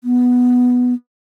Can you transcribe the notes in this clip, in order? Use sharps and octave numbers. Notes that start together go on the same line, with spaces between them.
B3